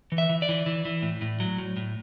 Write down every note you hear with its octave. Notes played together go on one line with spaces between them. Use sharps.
E3
E5
E3
D5
E3
E3
E3
A2
A2
F#3
A2
A2